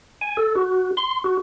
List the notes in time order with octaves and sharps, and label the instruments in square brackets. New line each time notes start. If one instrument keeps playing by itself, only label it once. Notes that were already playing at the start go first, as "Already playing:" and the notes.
[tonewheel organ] G#5
A4
F#4
C6
F#4